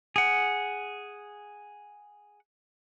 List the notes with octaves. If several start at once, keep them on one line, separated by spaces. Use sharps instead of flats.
G#4 F#5